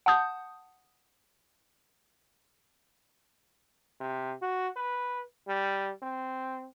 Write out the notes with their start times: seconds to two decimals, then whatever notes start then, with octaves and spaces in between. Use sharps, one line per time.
0.06 F#5 A5 D#6 G6
4.00 C3
4.42 F#4
4.76 B4
5.48 G3
6.02 C4